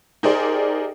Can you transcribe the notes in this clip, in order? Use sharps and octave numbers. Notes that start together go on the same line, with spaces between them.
D#4 G4 G#4 A#4 C5 D5